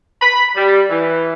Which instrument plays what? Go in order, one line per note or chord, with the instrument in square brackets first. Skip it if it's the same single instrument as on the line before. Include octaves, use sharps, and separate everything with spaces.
[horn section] B5
G3
E3